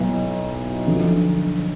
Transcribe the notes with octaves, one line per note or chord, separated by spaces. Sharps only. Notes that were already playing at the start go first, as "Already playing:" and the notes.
Already playing: B1 B2 B3 E4
D3 F3